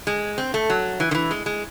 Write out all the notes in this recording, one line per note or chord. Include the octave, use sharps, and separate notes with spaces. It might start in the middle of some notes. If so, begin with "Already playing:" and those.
G#3
C4
A3
F#3
E3
D#3
E3
G#3
G#3